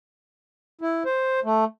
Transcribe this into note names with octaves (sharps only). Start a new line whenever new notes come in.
E4
C5
A3